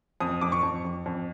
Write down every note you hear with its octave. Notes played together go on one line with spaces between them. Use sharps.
F2 D#6
F2 D6
C#6
F2
F2
F2